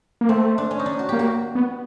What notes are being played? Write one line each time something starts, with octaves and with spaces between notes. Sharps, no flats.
A#3
A3 C4
D4
C#4
D#4
D4
F#4
A#3 G4
F#4
B3